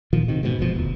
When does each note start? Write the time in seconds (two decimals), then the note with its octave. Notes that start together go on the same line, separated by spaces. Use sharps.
0.13 A#2 D#3 F3
0.28 C3 D#3
0.43 G#2 B2
0.59 F#1 B2 F3
0.75 E1 D2